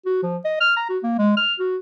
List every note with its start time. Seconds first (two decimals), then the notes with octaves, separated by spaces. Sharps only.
0.06 F#4
0.23 F3
0.45 D#5
0.60 F6
0.77 A#5
0.89 F#4
1.03 A#3
1.19 G#3
1.37 F6
1.59 F#4